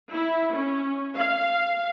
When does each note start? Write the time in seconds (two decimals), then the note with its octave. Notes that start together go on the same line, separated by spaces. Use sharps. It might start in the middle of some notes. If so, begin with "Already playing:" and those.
0.13 E4
0.55 C#4
1.17 F5